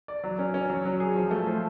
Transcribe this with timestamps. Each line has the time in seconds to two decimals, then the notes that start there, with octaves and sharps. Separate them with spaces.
0.08 D5
0.24 F#3
0.39 C#4
0.54 C#4
0.69 F#3
0.85 F#3
1.00 G#4
1.16 F3
1.31 A3
1.47 F3